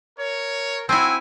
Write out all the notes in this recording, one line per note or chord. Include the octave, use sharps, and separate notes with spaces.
A#4 C#5
C4 E4 F#4 G5 G#5